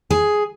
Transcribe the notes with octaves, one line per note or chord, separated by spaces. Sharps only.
G#4